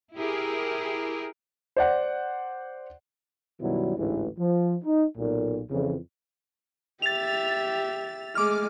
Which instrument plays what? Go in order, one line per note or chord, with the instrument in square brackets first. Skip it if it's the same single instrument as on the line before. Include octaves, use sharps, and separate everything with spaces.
[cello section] E4 G4 G#4 A#4
[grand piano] C5 D5 F#5
[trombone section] F#2 B2 D#3 F#3 G3 E4
A1 D2 G#2 E3
F3
D#4
B1 A#2
F2 C#3 E3
[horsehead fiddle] G4 E5 [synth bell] A6 F7
[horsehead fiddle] G#3 A3 [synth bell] D6 F6